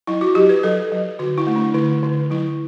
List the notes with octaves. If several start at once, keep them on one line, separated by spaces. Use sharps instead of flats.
F#3 E4
F#4
F#3 G4
B4
F#3 A4
F#3
D3 F#4
E4
A3
D4
D3 E4
D3
F#3 E4